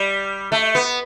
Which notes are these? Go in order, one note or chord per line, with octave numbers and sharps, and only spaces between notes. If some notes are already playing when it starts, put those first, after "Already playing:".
Already playing: G3
A3
B3